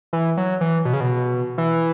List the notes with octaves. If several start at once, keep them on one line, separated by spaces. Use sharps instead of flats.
E3
F#3
E3
B2
C#3
B2
E3